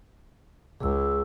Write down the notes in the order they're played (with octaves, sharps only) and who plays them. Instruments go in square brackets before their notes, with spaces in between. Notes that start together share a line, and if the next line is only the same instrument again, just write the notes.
[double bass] C#2 [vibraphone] G#4 E6